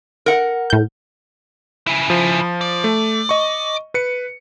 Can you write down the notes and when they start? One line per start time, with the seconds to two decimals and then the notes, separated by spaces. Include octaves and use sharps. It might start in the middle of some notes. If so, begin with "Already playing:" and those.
0.26 A#4 F#5
0.70 A2 G6
1.87 C#3 E4
2.10 F3
2.61 D5
2.84 A3
3.29 D#5 C#6
3.94 B4 C#7